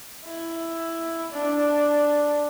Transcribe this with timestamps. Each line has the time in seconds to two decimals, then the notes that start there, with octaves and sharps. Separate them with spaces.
0.25 E4
1.32 D4